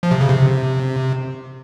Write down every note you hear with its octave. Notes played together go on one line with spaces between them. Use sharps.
F3
C3
C#3
C3